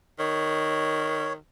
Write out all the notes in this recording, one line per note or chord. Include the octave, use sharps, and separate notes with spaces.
D#3 C#5